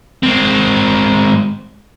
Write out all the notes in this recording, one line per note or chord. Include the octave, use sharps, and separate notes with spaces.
G#3 C4